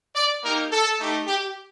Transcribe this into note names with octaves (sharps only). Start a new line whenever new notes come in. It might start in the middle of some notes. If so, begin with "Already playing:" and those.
D5
A#3 D#4 G4 A#4
A4
A3 D#4 G4
G4